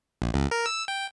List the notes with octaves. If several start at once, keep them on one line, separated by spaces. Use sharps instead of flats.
A#1
C#2
A#4
E6
G5